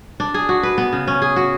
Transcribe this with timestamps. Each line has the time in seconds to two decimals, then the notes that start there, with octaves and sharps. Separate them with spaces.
0.20 D4
0.34 G#4
0.49 F#4
0.63 B4
0.78 B3
0.93 C#3
1.07 C#4
1.22 G#4
1.36 F#4